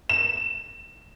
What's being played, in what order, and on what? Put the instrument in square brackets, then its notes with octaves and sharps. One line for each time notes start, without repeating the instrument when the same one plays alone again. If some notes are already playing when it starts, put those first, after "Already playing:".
[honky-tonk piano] E7